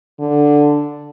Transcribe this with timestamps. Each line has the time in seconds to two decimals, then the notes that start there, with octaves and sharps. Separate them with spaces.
0.20 D3